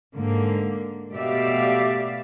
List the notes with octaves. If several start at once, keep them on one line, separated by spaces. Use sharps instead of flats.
G#2 D3 A#3
B2 A3 G4 D5 E5 F5